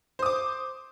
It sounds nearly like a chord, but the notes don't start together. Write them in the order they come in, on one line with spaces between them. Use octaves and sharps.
C5 D#6 D6